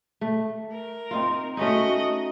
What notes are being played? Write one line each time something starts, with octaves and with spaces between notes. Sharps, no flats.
A3
A#4
C4 D#4 F4
A3 C#4 D#4 F#4 D#5